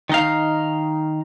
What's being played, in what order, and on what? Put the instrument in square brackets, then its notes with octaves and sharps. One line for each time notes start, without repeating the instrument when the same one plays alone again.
[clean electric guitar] D#3 D#4 F5